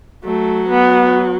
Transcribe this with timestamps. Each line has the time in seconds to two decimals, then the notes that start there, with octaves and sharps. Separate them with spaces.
0.25 F#3 A3
0.69 B3